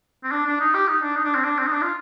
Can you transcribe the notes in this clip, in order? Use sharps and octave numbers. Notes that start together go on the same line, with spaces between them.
C4
D4
D4
D#4
G4
D#4
D4
D#4
D4
C4
D4
C4
D#4
D4
F4